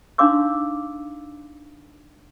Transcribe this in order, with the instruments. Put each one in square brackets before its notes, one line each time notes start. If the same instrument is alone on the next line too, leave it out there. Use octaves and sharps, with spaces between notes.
[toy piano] D4 D#4 F5 C6 D6 E6